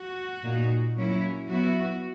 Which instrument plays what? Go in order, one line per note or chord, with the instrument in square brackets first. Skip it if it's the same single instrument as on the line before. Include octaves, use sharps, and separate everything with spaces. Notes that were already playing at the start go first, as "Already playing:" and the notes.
Already playing: [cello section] F#4
A#2 A#3 D#4
F#3 A#3 C#4 E4
F#3 B3 E4 F#4